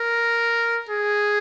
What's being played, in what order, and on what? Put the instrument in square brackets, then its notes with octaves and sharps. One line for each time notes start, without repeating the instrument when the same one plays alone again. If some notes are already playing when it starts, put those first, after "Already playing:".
Already playing: [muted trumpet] A#4
G#4